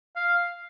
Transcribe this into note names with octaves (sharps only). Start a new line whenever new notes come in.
F5